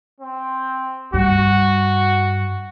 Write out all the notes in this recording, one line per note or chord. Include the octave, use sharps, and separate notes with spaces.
C4
G2 F#4